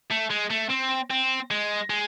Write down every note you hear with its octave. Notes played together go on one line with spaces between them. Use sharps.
A3
G#3
A3
C4
C4
G#3
G#3